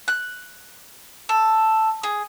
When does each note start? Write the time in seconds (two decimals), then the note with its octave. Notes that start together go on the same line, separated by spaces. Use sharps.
0.08 F#6
1.29 A4
2.03 G#4